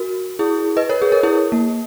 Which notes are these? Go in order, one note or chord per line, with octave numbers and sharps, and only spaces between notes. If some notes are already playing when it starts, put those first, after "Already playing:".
Already playing: F#4 A#4
E4 G#4
B4 D#5
A#4 C#5
G#4
A#4
E4 G#4
A#3